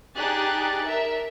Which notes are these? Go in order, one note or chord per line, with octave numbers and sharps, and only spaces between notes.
D4 D#4 G4 G#4 F#6 A6
A#4 E5